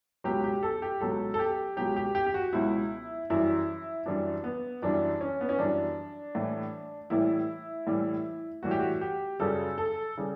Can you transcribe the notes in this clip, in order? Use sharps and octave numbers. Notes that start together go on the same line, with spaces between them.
C#2 B2 F#3 G4
G4
A4
G4
C#2 B2 F#3 A4
A4
G4
C#2 B2 F#3 G4
G4
G4
G4
F#4
C#2 B2 F#3 E4
F#2 E3 G3 E4
F#2 E3 G3 D4
B3
F#2 E3 G3 D4
C#4
B3
C#4
F#2 E3 G3 D4
A2 E3 G3
A2 E3 G3 E4
A2 E3 G3
A2 E3 G3 F#4
G4
F#4
G4
F#2 C#3 G3 A4
A4
C#3 G3